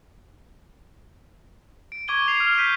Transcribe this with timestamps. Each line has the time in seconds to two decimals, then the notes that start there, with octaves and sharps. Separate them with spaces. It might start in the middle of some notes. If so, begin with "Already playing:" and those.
1.92 D7
2.08 C#6 D6 G#6 D#7 G7
2.28 C7 F7
2.40 F6
2.58 G6 B6 D#7